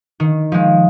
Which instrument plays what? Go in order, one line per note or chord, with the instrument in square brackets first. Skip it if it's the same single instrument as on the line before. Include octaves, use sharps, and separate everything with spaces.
[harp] D#3
F3 G#3